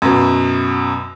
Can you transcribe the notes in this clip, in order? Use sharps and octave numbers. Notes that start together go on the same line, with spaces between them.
F#2 B2